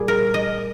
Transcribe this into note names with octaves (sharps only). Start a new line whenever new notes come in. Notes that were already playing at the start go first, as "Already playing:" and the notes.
Already playing: A#2 G3 G#4
A#4
D#5